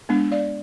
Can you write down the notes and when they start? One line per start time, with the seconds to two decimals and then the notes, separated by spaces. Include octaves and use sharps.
0.09 G#3 B3 D4
0.31 D5 F5